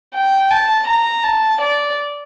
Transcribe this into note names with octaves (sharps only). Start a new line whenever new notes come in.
G5
A5
A#5
A5
D5